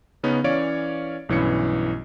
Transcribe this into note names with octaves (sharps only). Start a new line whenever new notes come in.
C#3 B3 C#4 D#4
E3 C#4 C#5 D5 F5 D7
B1 G2 E3 C#4 E4 C#7